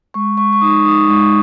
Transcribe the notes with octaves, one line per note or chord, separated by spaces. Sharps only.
G#3 C#6
G#3 C#6
C#6
D#4 D#6
D#4 D#6
G#3 C#6